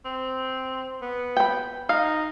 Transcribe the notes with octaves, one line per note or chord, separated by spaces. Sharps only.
C4
B3
G5 B5
D#4 F5